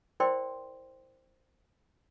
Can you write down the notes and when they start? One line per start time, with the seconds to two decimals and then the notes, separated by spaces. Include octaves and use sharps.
0.20 E4 A#4 C5 D5 G5 C6